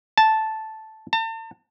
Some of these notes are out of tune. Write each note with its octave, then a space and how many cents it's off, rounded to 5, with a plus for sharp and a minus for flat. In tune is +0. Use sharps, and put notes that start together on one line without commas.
A5 -5
A5 +40